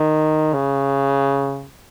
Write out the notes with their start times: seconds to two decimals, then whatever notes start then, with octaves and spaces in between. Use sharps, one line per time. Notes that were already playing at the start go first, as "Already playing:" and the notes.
Already playing: D#3
0.53 C#3